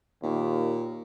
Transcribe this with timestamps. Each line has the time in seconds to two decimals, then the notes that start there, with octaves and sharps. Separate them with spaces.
0.23 D#2 A#2